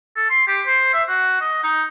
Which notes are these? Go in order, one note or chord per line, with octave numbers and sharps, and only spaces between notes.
A4
C6
G4
C5
E5
F#4
D#5
D#4